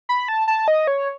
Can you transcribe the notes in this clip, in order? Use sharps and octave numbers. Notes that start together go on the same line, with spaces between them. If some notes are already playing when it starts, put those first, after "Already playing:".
B5
A5
A5
D#5
C#5